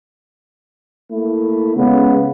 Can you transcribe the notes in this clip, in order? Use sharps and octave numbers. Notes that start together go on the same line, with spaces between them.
A3 A#3 E4
C#3 G#3 B3